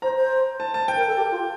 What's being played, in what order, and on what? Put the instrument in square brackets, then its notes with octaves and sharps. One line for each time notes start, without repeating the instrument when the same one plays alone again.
[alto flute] C5 [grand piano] A#5
[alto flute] C5
[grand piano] A5
A5
G5
[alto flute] A#4
A4
G4
F4